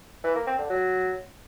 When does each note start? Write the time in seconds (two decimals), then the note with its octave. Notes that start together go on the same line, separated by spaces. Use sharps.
0.24 E3
0.35 A#3
0.47 C4
0.58 D3
0.70 F#3